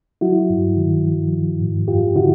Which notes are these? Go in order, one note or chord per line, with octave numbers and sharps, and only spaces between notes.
F#3 E4 F#4
G2
D#3
F3
F3
G#2
F#2 F4 G4
D3 E4 F#4